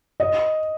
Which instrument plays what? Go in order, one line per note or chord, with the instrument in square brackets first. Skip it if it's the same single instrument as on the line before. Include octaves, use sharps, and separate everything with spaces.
[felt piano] D#5